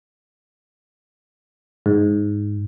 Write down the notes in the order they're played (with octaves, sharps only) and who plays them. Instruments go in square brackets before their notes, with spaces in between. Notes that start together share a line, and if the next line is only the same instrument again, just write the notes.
[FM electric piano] G#2